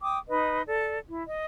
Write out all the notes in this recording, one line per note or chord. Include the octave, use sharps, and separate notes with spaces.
G5 D6 D#6
D#4 B4 D#5
A4 D5
E4
D#5